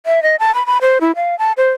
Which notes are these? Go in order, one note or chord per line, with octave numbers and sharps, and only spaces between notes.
E5
D#5
A5
B5
B5
C5
E4
F5
A5
C5